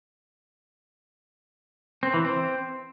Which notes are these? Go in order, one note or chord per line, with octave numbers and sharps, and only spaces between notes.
C4
E3
C4